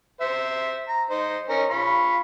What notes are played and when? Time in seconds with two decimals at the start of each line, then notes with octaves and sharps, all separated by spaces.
0.21 C5 E5
0.88 A#5
1.10 D#4 C5
1.49 C#4 D#4 A#4
1.70 F4 B5 C#6